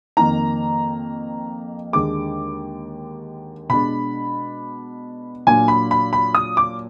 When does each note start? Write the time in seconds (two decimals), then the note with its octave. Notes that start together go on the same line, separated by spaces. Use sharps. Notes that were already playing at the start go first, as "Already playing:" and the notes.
0.17 F2 D#3 A#3 D#4 A#5
1.93 D#2 D3 G#3 D6
3.69 B2 G#3 D4 B5
5.47 A#2 F#3 A#3 D4 G#5
5.68 B5
5.91 B5
6.13 B5
6.35 D#6
6.57 D6